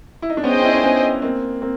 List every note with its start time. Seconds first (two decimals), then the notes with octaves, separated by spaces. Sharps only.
0.22 E4
0.30 D#4
0.37 D4
0.43 B3 C#4 G#4 C5 D#5 G5
0.53 C#4 D#4
0.63 D4 E4
0.73 C#4 D#4
0.83 B3 C#4
1.22 A#3 C4
1.62 A#3 C4